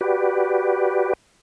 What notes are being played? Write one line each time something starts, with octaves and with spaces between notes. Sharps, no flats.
F#4 G4 B4 D5